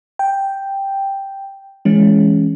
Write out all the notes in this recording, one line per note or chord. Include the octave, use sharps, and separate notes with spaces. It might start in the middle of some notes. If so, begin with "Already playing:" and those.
G5
E3 G#3 C#4